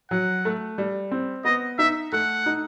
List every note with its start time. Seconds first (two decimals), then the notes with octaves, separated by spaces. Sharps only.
0.11 F#3 F#5
0.45 A3
0.78 G3
1.12 C4
1.45 B3 D#5
1.78 D#4 E5
2.13 A3 F#5
2.46 D#4